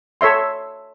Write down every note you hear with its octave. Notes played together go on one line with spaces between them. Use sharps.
A4 C#5 E5 C6